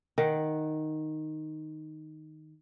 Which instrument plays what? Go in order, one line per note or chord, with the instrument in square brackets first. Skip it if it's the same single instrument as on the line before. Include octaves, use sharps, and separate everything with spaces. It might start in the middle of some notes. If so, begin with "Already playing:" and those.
[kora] D#3 F#5